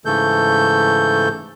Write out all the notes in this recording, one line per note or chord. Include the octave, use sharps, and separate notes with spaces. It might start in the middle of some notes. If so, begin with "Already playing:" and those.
G#2 C#3 E3 A3 A4 G6